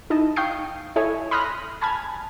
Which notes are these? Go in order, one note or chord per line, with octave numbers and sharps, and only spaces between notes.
D#4 E4 D#5 A5
F5 G5 C#6 D#6 G6 C7
E4 A4 C#5 D#5 E5 G#5
B5 C6 D#6 F6 F#6 A#6
G#5 A5 B5 F6 G#6